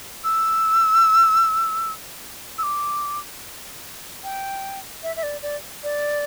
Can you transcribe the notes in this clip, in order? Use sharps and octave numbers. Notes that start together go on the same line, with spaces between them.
E6
E6
D6
G5
E5
E5
D5
D5
D5